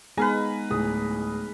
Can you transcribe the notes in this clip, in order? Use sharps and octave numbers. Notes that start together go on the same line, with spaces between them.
G#3 B3 D#4 G#4 B4 F5 G#5 A#5
D1 A2 G#4 D#6